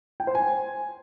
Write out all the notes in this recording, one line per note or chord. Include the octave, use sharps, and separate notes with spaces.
G5
C5
G#5